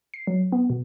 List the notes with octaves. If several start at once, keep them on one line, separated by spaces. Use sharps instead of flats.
C7
F#3
B3
B2